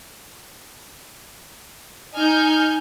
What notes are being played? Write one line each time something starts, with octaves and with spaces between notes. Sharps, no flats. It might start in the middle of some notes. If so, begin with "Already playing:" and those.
D#4 G#5 F6 G6